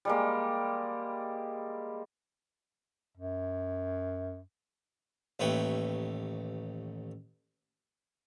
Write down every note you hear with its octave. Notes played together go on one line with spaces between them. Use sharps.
G3 G#3 A#3
F#2
A1 D#2 A3 B4 C#5 G5